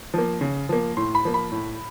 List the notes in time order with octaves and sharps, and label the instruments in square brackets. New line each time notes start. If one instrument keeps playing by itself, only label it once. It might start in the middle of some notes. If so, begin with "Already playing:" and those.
[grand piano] F3 A#3
C#3
F3 A#3
A2 C6
B5
F3 A#3
B5
A2